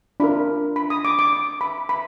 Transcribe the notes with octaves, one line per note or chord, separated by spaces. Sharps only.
D4 F4 A#4 B5
B5
D#6
D6
D6
D6
B5
B5